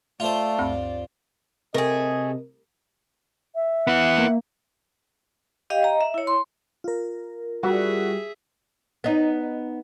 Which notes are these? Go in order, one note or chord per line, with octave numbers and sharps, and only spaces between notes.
A3 F4 C5 D5 E5
D2 G2 C4
C3 A3 G#4 A#4 D#5
E5
B3 E4 F#5
A#3
G4 D#5 F5 G5
D#5 A#5
E5
E4 C#5
C6
F4 A#4
G3 F#4 G#4 E5
B3 D#4